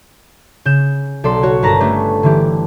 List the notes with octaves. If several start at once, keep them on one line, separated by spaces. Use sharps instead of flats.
C#3 G6 E7
B1 A4 D5 C6 C7
F#4 C#5
G1 A#4 B4 A5 A#5 A#6
A3 C#4 D4 G4
D3 E3 G4